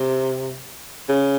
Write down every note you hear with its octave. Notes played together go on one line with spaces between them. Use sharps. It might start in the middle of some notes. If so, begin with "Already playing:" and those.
Already playing: C3
C#3